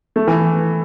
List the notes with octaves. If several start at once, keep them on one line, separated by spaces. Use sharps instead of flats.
A3
E3